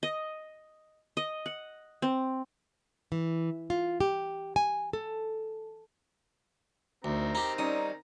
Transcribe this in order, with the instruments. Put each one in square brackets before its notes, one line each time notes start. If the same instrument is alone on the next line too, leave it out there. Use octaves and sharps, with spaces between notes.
[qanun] D#5
D#5
F#5
C4
[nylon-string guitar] E3
F4
G4
G#5
A4
[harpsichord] D2 [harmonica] D#3 C4 A#5
[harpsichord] D#4 G4
[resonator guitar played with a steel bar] G3 C#4 D#4 [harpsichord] D#6